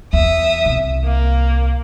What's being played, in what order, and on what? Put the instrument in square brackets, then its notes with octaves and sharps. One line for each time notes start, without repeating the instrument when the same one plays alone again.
[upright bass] E2 [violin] E5 D#6
[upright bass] C2
[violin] A#3